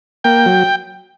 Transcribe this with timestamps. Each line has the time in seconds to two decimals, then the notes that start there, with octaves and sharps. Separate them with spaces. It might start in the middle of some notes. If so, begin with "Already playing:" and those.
0.24 A#3 G5
0.46 F#3